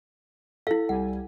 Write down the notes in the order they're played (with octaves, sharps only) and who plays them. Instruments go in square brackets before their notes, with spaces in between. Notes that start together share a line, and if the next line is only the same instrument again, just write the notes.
[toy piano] E4 F5 [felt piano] A4
[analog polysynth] C2 G3 G#5 [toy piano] F#5